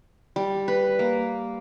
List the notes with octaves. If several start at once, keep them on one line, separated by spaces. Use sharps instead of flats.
G3
B4
A#3